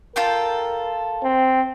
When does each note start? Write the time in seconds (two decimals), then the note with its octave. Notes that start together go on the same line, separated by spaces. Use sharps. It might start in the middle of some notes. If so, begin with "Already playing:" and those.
0.16 F4 A4 A#4 G5
1.23 C4